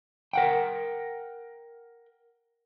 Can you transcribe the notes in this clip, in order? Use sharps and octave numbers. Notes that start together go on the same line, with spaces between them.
A#4 F#5 G5